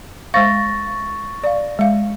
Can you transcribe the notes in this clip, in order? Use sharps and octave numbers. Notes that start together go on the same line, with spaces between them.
G#3 C5 F5 C#6 A6 A#6
D5 F5
G#3 F5